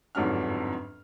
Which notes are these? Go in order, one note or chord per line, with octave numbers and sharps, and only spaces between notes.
G1 F2 G#2 F#3 D4 F6